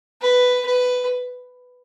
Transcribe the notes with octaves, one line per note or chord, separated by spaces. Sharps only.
B4
B4